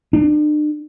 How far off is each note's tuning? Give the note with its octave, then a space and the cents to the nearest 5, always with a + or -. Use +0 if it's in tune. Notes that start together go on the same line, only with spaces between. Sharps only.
D4 +40